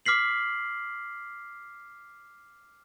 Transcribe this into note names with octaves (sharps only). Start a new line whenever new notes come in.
D6 F6 B6 C7 F#7